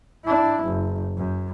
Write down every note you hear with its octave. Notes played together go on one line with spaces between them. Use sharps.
D4 E4
F#1
F#2